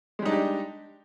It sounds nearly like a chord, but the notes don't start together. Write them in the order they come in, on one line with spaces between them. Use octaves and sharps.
G#3 G3 D#4 D4 G4